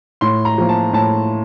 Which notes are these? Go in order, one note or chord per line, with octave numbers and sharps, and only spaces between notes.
A2 C6
A#5
F3 A#3
A5
A2 A5